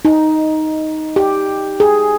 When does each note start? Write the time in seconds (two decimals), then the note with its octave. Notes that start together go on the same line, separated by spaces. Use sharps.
0.05 D#4
1.16 G4
1.80 G#4